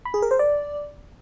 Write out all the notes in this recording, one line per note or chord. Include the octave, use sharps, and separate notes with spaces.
B5
G#4
A#4
C5
D5